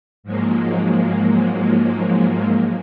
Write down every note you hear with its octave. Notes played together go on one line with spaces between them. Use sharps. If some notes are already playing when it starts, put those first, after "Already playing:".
G#2 F3 F#3 G#3 A#3